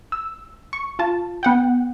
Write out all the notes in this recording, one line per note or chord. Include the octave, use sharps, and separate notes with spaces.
E6
C#6
F4 A5
B3 F#5 G5